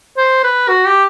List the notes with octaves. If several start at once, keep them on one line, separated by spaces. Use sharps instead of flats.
C5
B4
F#4
G4